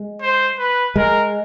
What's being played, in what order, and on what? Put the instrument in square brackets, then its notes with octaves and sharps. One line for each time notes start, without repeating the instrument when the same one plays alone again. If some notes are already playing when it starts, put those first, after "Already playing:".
Already playing: [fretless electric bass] G#3
[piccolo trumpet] C5
B4
[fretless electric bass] G#3 [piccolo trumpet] A#4